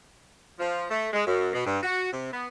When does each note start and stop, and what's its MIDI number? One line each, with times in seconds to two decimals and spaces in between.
0.58 0.84 53
0.90 1.08 57
1.13 1.22 56
1.26 1.50 42
1.53 1.63 47
1.65 1.78 43
1.83 2.12 66
2.13 2.32 48
2.32 2.48 59